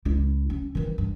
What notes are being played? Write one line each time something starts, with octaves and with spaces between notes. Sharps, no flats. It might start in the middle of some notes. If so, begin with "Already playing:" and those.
C#2 E4
C#4
D#3 E3
G2